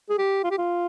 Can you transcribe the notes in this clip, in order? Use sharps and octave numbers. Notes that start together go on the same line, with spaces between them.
G#4
G4
F4
G4
F4